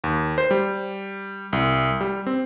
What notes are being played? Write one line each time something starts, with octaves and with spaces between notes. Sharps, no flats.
D#2
C5
G3
C2
G3
C4